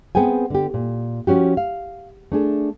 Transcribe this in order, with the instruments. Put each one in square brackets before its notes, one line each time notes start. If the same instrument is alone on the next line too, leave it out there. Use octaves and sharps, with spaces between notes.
[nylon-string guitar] B3 C4 G#4 G5 G#5
D3 G4
A#2
F3 C#4 F#4 G4
F5
A3 D4 G#4